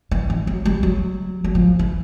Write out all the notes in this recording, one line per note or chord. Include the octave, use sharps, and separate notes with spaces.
E3
E3
F#3
G3
F#3
F#3
F3
E3